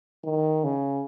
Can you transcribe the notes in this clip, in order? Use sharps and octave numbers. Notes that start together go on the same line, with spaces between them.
D#3
C#3